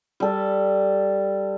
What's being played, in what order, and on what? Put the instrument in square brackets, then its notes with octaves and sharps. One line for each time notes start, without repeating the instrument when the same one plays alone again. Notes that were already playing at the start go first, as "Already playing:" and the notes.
[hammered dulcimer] G3 A4